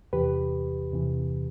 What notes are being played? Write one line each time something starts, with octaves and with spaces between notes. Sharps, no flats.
E2 C3 E3 G4 B4
E2 C3 E3